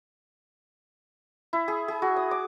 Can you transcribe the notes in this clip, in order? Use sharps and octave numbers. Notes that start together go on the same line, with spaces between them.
E4
G#4
G#4
F#4
D#6
D6